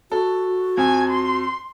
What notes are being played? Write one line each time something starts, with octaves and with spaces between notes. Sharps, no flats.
F#4 A4
F2 G#5
C6